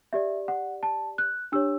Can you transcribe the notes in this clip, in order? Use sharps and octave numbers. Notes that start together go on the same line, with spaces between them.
G4 D5 E5
F#5
A5
F#6
D4 G4 C#5 E6